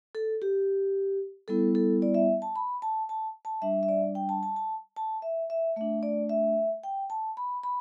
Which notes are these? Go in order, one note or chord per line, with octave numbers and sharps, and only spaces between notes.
A4
G4
G3 B3 E4 A4
A4
D5
E5
A5
B5
A5
A5
A5
G3 D4 E5
E5
D5
G5
A5
A5
A5
A5
E5
E5
A3 D4 E5
D5
E5
G5
A5
B5
B5